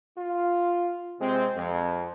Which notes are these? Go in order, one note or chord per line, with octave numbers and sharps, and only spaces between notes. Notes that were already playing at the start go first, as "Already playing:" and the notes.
F4
C3 G#3 C4
F2